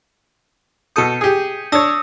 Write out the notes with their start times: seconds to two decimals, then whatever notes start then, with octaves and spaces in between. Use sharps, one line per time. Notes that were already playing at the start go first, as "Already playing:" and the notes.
0.96 B2 A4 D#6 G6 C#7 D#7
1.21 G4 G#4
1.72 D4 C#5 D#6 E6 A#6